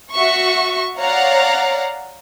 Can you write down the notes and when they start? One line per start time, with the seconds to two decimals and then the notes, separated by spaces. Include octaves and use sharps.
0.12 F#4 E5 C#6
0.98 C#5 D5 F5 F#5 A#5